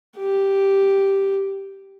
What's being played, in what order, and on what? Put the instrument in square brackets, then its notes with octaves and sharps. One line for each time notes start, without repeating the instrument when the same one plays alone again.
[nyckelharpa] G4